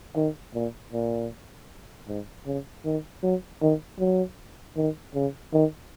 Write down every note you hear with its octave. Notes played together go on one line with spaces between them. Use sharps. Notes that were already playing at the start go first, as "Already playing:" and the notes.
D#3
A#2
A#2
G#2
C#3
D#3
F#3
D#3
F#3
D#3
C#3
D#3